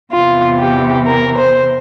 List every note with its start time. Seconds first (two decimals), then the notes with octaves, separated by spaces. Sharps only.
0.12 E2 C3 E3 F4
0.60 G4
1.06 A#4
1.38 C5